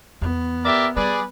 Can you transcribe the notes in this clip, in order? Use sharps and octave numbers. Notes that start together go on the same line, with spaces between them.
E2 B3
G4 A#4 D5 E5
G3 G#4 B4 D5